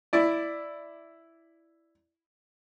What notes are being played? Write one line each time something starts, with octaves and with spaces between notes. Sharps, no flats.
E4 D5